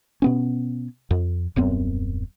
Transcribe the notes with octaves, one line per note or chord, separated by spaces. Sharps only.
B2 B3 C#4
F2
D#1 F#2 B3 C4